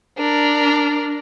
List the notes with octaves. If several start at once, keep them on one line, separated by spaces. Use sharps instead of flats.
D4 A#4